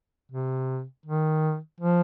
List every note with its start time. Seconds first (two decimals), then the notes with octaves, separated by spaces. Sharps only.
0.32 C3
1.06 D#3
1.81 F3